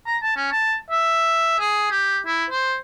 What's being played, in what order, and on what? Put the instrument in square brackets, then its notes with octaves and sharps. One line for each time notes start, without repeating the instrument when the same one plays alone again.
[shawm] A#5
A5
C#4
A5
E5
G#4
G4
E4
C5